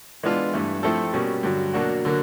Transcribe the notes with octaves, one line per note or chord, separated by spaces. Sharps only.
E3 G#3 B3 D4 F4
G2 E3 A3
F3 A3 C4 E4 A4
B2 G3 A#3 C#4
G2 D3 F#3
B2 F#3 A#3 D4 F#4
D3 F#3 A#3